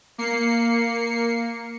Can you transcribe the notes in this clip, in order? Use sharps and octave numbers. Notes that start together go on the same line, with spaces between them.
A#3 C7 C#7